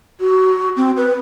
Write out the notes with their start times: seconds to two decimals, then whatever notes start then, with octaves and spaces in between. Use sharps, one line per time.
0.20 F#4
0.76 C4
0.97 B4